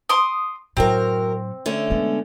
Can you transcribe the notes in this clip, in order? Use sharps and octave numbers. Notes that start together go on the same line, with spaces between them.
C6 D6 D#6
F#2 A2 F#3 C4 G#4 A#4
D3 A3 C#4
G#3 B3